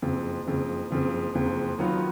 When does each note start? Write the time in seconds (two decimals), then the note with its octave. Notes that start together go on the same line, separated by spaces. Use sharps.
0.02 F#1 F2 C#3
0.47 F#1 F2 C#3
0.91 F#1 F2 C#3
1.35 F#1 F2 C#3
1.79 D#3 F#3 B3 F4 B4